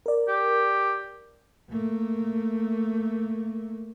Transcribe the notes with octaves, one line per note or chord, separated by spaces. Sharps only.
A#4 D5
G4
A3 A#3